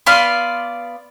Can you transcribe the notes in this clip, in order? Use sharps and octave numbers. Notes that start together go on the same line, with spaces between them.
B3 D5 F5 C6